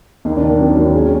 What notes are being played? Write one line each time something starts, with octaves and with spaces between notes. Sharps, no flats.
D#2 D#4
D4
D#3
A#3
F#3 C4
C#4
D#2
D4
C#4 G#4